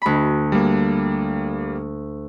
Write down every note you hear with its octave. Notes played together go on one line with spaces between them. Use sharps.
D2 B5
G3 A#3